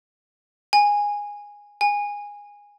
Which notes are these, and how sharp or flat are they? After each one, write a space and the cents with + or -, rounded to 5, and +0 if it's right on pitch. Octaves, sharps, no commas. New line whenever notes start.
G#5 -10
G#5 -15